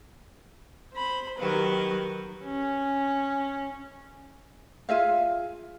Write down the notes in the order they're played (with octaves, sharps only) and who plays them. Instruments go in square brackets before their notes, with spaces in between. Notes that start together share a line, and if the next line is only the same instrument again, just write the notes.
[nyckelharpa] C5 B5
[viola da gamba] D#3 F#3 A#4 [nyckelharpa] G4 B4
[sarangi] C#4
[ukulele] F4 G#4 E5 F5